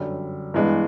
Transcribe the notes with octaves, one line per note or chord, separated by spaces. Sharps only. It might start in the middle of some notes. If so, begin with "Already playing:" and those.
Already playing: G1 F#2 D3 G3
G2 E3 G#3 B3